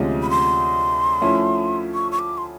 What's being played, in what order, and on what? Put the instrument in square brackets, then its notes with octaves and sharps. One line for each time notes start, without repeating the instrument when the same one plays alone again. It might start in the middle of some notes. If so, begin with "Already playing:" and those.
Already playing: [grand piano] D2 C3 F3 G#3 C#4
[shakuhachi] B5
C6
[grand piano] F3 A3 C#4 E4
[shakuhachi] C#6
C#6
D6
C6